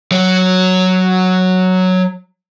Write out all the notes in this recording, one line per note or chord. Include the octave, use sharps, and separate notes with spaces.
F#3 C#5